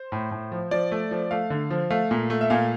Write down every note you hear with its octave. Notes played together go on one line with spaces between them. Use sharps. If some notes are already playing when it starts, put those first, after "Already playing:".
Already playing: C5
A2
A2
F3
F3 D5
A3
F3
A3 F5
D3
F3
A3 F5
A#2
A3
E5
A#2 F5